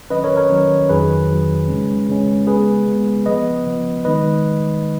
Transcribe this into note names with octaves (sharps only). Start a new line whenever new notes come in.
D#3 F#3 C#4 B4 D#5
A#4 C#5
A#4 C#5
D#3 F#3 C#4
F2 D#3 F#3 G#4 B4
F2 D#3 F#3
C#3 G#3 C#4
C#3 G#3 C#4
C#3 G#3 B3 G#4 B4
C#3 G#3 B3
C#3 F3 B3 B4 D#5
C#3 F3 B3
D#3 G#3 D#4 B4 D#5